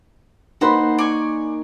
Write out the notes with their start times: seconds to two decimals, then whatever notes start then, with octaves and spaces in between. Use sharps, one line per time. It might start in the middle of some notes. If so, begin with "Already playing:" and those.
0.61 A#3 D#4 F#4 C5 B5
0.98 D5 G#5 C#6